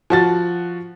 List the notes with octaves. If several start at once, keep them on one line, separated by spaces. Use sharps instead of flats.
F3 F#4 A6